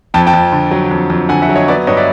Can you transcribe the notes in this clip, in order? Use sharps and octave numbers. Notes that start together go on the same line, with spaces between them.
F2 G5 A5
G5 A5
F2
D3
F#3
F2
F2
D3 F#5 G#5
E5 F#5
F#3
C#5 D#5
B3 D5 E5
G2 C#5 D#5
D5 E5